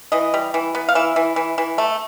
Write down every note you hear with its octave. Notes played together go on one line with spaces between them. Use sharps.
E3 D#5
G3
E3
B3
F5
E3 E5
E3
E3
E3
A3